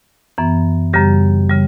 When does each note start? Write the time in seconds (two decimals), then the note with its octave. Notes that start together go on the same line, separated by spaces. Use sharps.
0.38 F#2 E3 B3
0.93 F#2 C#3 G3 G4
1.49 C#3 G3